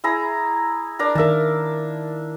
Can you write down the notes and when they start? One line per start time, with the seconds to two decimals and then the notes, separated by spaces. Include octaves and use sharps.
0.04 E4 G#4 A#5
0.99 D4 A#4 A#5
1.15 D#3 A#4 E5 A5